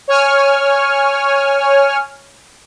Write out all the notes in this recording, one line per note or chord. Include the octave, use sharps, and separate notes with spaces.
C#5 G#5 F6